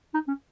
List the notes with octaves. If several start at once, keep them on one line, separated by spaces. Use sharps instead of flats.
D#4
C#4